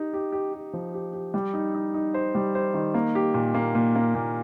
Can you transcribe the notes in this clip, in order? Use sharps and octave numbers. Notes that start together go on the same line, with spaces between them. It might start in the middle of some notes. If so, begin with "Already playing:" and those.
Already playing: D#4 G4
G4
G4
G4
F3
G4
G4
G3
D#4
D#4
D#4
C5
G3
C5
D#3
A#3
G4
A#2
A#3
A#2
A#3
A#2